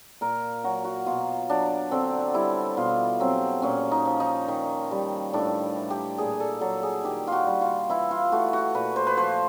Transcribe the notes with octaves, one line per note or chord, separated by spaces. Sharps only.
A#2 A#4
F#3 F#4
F#4
B2 F4
F#3 D4
D3 C4
G3 E4
B2 F4
F#3 C4
A#2 C#4
D#4
F3
D#4
D#3
G3
A2 D4
E3
G4
A#2 G#4
A4
F#3 A4
G#4
D#3 G4
F4
F#4
G3
F4
E3 E4
F4
A3 F#4
F#4
A#2 B4
C5
B4
F3 C5